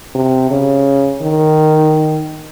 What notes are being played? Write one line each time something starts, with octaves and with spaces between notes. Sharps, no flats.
C3
C#3
D#3